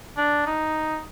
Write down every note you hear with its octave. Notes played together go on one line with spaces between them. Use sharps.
D4
D#4